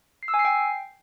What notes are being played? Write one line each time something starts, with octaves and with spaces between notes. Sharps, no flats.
C7
E6
G#5
C7
G5